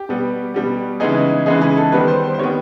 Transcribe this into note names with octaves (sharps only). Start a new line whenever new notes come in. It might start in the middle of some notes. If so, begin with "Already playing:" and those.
Already playing: G4
B2 G3 B3
B2 G3 B3
C#3 E3 G#3 B3 D#4 G#4
C#3 E3 G#3 B3 D#4 G#4
G#4
A4
D#3 G3 B3 B4
C5
C5
C5
D#3 G3 B3 C#5